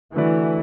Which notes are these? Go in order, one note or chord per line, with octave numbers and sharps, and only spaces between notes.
D3 E3 A3 F#4 B4 D5